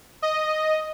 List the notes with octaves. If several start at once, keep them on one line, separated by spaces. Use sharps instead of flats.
D#5